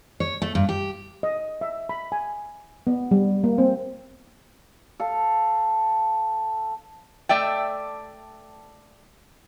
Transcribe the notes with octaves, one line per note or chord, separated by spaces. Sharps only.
C#5
A3
G2
G4
D#5
E5
B5
G#5
B3
G3
A#3
C4
A4 F5
A3 D5 E5 G5